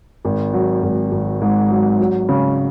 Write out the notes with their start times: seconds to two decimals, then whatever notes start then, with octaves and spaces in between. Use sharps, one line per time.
0.25 G#1
0.54 F#3
0.83 G#1
1.12 G#1
1.42 G#2
1.70 F#3
2.00 F#3
2.29 C#3